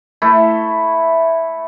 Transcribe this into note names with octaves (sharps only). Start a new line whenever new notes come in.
A3 E4